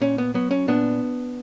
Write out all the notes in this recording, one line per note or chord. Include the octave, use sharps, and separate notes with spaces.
A#2 C#4
B3
F#3 B3
C#4
A#2 B3 D4